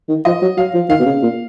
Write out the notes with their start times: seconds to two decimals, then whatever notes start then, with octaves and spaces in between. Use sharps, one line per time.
0.09 D#3
0.25 F3 D#5
0.42 F#3
0.57 F#3 F5
0.74 F3
0.89 D#3 F5
0.99 B2
1.05 C#3
1.22 A#2